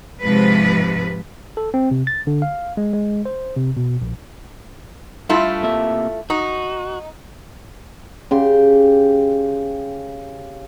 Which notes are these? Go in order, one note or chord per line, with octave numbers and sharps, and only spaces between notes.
G#2 C3 F3 B4
A4
C4
C3
A6
D3
F5
G#3
G#3
C5
C3
B2
A#1
G2 A3 E4 F4 A4
C3 A#3 E5
D#4 F#4
C#3 G4 C6